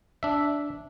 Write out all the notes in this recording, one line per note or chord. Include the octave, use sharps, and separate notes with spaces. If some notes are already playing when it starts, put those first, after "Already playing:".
D4 E5